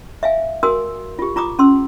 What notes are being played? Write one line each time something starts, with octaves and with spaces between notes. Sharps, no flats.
E5 F5 G#5
F#4 A#4 G#5 C6 D#6 E6
F4 G4
F4 A#5 D6 D#6
C#4 C6 E6